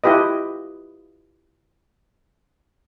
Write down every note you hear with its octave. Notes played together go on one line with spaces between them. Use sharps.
E4 F4 G4 B4 D#5